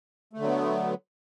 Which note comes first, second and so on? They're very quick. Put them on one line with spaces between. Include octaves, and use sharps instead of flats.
A3 D3 F#3 B3